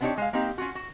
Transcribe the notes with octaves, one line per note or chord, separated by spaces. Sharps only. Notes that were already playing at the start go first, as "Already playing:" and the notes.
B3 C4 D4 D#4 G4 C#5
G#3 F5
A#3 C4 D#4 G4
C#4 F4 F#4
F#4